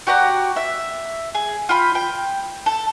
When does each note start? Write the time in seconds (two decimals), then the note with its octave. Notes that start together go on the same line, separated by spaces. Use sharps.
0.07 F#4 G4 D5 A#5
0.56 E5
1.35 G#4
1.69 F4 G5 B5
1.95 G5
2.66 A4